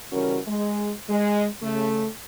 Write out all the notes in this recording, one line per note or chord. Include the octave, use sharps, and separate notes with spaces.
C#3 E3 G3 C#4 F#4 A#4
G#3
G#3
C#3 A3